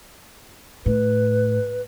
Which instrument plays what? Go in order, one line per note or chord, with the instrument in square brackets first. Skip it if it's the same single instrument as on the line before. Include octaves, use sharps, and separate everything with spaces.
[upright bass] A2 [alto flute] B4